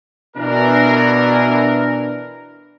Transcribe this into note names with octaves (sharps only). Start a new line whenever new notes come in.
B2 E3 D4 A#4